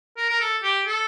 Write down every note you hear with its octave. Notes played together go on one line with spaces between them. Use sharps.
A#4
A#4
A4
G4
A4